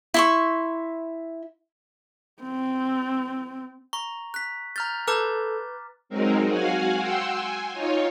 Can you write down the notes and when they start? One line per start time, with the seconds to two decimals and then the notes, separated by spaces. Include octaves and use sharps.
0.14 E4 C6 C#6
2.43 C4
3.93 A#5 C#6
4.34 F#6 B6
4.76 A#5 F6 G6 A6
5.07 A4 B4 A#5 D6 F6 G6
6.09 F#3 G#3 C4 D#4 A#4
6.48 F#4 F5 F#5 G#5
6.97 F#5 G5 C6 E6
7.35 G#5
7.73 D#4 F4 C#5